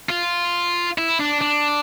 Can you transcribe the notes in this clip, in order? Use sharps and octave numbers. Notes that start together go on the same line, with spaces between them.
F4
E4
D4
D4